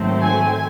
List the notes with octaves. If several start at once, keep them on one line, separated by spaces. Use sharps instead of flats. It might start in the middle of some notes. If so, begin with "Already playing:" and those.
Already playing: G#2 D#3 F#3 A3 C4
G#5